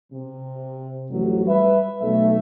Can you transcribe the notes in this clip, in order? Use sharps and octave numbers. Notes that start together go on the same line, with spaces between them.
C3
A1 F2 F#3
G3 B4 E5
B1 A3 E5